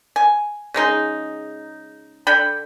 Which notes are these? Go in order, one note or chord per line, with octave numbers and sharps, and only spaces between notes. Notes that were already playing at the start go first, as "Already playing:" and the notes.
G#5
C#3 G#3 D#4
D3 D4 G5 B5